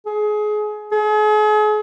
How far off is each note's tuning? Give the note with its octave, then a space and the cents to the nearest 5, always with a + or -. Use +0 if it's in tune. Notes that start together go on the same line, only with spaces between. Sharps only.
G#4 +25
G#4 +40